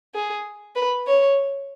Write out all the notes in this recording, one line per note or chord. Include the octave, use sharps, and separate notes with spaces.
G#4
B4
C#5